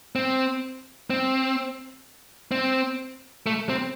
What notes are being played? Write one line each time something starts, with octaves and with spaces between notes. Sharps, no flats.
C4
C4
C4
A3
C4